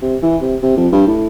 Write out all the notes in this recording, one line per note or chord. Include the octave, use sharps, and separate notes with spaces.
C3
E3
C3
C3
F2
G2
A2